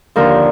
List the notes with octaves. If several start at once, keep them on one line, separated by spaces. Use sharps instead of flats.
D#2 D3 F3 A#4